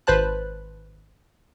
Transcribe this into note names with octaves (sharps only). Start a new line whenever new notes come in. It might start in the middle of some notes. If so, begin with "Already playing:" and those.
G#1 B4 C5 A5 F#6